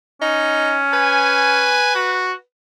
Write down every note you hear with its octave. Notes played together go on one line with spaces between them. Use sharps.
C#4 D#4
B4 G#5
F#4